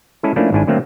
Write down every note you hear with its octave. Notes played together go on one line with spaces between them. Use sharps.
G#3 C#4 E4 G#4 A4
F3 A3 A#3 C#4 D4 E4
G#1 G#2 D4 E4 G#5
D3 F#3 A3 A#3 C4